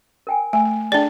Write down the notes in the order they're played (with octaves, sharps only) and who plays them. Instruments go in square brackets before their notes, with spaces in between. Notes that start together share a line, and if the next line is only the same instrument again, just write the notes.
[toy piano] A#4 G5 G#5
[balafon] A3 [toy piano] G#5
[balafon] D4 D5 [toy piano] G#4 A4 G5